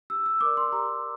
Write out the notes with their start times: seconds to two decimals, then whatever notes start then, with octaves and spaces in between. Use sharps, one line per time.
0.10 G4 E6
0.26 E6
0.41 A#4 D5 D6
0.57 C6
0.72 G4 A#5